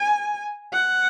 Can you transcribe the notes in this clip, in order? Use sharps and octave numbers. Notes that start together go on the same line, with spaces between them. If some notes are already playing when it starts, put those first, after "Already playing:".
Already playing: G#5
F#5